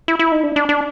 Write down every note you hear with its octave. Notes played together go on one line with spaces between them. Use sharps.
E4
E4
D#4
D4
D4
D4